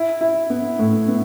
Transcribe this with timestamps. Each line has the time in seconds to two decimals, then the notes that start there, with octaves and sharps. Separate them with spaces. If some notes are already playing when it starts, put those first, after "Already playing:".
Already playing: E4
0.21 E4
0.50 B3
0.79 A2
1.08 B3